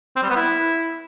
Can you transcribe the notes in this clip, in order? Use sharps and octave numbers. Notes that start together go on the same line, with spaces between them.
C4
G3
B3
E4